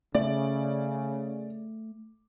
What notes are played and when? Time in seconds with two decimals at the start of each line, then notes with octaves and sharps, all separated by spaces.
0.15 C#3 A3 D5